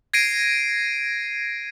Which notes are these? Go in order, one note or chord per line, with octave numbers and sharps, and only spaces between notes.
G#6 A#6 C7 D7 D#7